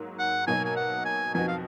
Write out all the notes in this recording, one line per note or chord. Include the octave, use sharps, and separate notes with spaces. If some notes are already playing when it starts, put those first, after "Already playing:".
Already playing: G#2 F#3 A#3
F#5
B2 F#3 A#3 D#4 A#4 G#5
G#5
F#5
G#5
F2 F3 B3 D#4 F#4 G#5
F5